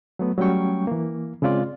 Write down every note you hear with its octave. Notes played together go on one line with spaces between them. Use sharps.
F#3 A3 B3
F#3 G3 A3 C#4 G5 C#6
E3 A#3
C#3 G#3 C4 F4 D5